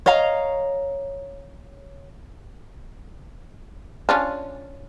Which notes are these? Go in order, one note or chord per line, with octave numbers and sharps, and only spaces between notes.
C#5 D#5 F5 A#5
C#4 D4 F4